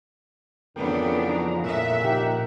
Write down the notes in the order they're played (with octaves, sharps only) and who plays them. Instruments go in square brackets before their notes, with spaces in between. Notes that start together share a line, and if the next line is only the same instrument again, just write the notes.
[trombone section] F2 C#3 [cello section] E3 B3 D4 [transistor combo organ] A#4 G5
[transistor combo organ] F3 D#4 A#5
[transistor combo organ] A#2 A#4 F#5 [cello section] E5
[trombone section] F3 D#4 G4